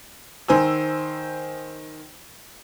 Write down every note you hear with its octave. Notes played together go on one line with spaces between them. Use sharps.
D#3 C5 G#5 E6